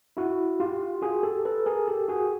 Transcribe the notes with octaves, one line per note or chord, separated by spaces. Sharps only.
E4 F#4
F4 G4
F#4 G#4
G4 A4
A4 B4
G#4 A#4
G4 A4
F#4 G#4